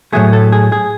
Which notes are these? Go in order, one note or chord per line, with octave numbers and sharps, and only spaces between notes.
A2 F#3 A3 G#4
A4
G#4
G#4